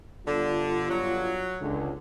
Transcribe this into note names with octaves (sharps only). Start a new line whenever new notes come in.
G1 D3 D4 F4
F#3
C#2 D3